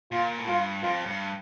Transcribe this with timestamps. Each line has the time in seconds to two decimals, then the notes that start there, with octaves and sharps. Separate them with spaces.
0.12 A#2 F4
0.38 A2
0.48 G2 F4
0.83 F2 F4
1.06 G2